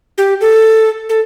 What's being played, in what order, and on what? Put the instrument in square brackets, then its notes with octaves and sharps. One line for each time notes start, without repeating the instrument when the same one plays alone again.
[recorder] G4
A4
A4